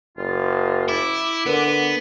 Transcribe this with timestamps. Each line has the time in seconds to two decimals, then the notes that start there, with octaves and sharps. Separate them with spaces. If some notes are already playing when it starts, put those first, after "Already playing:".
0.17 F#1 F4
0.88 E4 D6
1.46 D3 B3 A#4 B4 D#7